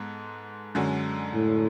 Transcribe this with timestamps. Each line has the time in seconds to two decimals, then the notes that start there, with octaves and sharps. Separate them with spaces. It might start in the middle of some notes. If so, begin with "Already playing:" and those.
Already playing: G#2 G#3 B3 A4
0.75 F#2 D3 G#3 C#4 F#4
1.35 A2